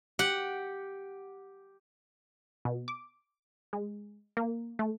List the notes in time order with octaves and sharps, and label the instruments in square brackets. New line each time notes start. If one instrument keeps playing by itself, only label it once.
[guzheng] G4 F#5
[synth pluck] B2
D6
G#3
A#3
A3